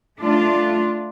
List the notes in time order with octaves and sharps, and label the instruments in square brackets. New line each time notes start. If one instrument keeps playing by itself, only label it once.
[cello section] A3 D4 F4